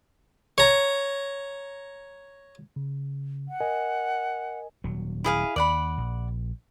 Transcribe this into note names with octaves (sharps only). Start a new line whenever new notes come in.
C#5 A#5
C#3
F#5
A#4 D#5 G#5
D#1 F#3
E4 G#4 F5
D#2 D5 F#5 B5
A#1